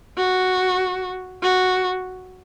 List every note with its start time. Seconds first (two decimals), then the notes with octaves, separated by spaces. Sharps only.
0.18 F#4
1.43 F#4